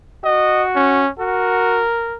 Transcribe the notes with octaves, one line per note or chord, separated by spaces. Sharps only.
F#4 D#5
C#4
F#4 A#4